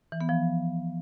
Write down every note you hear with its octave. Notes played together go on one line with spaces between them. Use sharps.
E3
B3
F3